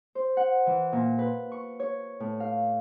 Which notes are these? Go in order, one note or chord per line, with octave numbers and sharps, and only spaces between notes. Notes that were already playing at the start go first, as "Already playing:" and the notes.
C5
F#5
E3
A#2
B4
C#6
C#5
A2
F5